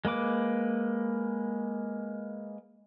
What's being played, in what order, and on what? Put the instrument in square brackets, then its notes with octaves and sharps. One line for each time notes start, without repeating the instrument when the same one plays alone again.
[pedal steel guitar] G#3 A#3 B4 D6